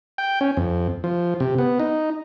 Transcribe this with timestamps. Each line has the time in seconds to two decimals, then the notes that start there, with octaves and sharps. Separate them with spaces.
0.18 G5
0.41 C#4
0.57 F2
1.04 F3
1.40 C3
1.58 B3
1.80 D#4